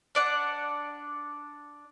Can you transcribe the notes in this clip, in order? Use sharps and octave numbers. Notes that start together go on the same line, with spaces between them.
D4 D5 F#5